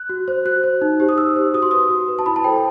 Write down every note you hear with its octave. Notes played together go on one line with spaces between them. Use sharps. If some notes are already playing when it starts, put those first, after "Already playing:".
Already playing: F#6
F#4
C5
F#4 F#6
C5
D#4
G4 C5
D#6
D#4 E6
G4 C5
F#4 D#6
C6
B4 D#6
F#4
B4
A5
E4 B5
A5
A4 C5 G5